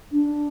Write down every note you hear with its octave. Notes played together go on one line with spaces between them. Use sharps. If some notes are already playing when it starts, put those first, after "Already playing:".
D4